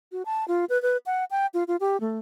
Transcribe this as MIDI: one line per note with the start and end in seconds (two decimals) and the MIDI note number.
0.12 0.23 66
0.26 0.46 81
0.48 0.65 65
0.69 0.80 71
0.82 0.97 71
1.06 1.25 78
1.31 1.46 79
1.54 1.64 65
1.68 1.76 65
1.80 2.00 67
2.01 2.20 57